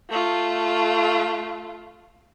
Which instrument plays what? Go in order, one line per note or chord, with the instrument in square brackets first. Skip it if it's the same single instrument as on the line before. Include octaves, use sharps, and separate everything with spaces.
[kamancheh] A3 F4